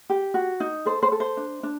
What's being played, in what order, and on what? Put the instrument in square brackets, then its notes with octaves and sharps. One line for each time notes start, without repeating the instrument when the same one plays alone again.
[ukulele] G4
F#4
D#4
A4 C5
C5
A4
C5
D4
D4